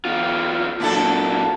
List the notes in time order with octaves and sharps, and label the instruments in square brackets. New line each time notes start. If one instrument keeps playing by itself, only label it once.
[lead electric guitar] E2 F4
[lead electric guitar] A#2 F#3 [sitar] D4 E4 A4